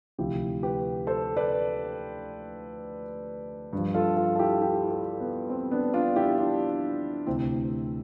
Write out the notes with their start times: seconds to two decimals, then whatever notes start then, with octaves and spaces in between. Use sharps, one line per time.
0.18 D2 C3 F3 E4 G4
0.63 G4 B4
1.07 A4 C5
1.37 B4 D5
3.73 G2 F3
3.94 F4 A4
4.17 F4 A4
4.35 A4
4.39 E4 G4
4.61 E4 G4
4.91 F4 A4
5.20 B3
5.50 C4
5.71 B3 D4
5.94 D4 F4
6.16 E4 G4
6.38 D4 F4
7.27 D2 C3 E3 C4 E4